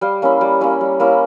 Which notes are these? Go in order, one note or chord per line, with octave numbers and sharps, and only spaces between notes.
G3 F5 G5
A#3 C#4 E4
G3
A#3 C#4 E4
G3
A#3 C#4 E4